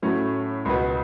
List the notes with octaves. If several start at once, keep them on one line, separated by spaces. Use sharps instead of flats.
A2 F#3 A3 C#4
C#2 B2 B3